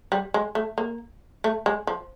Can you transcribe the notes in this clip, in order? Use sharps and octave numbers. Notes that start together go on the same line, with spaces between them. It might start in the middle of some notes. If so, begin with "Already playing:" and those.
G3
G#3
A3
A#3
A3
G#3
F3